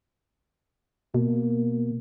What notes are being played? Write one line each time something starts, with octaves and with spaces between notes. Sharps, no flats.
B2 A#3